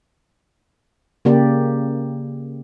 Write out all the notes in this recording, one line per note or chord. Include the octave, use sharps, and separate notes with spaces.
C#3 A#3 G4 D5